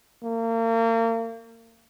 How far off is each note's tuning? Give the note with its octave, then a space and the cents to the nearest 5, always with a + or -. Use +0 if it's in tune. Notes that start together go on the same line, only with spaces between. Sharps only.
A#3 -35